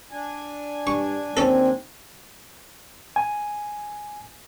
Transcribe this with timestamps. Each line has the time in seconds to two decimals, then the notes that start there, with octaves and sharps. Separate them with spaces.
0.12 D4 G#5
0.87 G2 C#6
1.37 D#2 C4 C#4 A4
3.16 G#5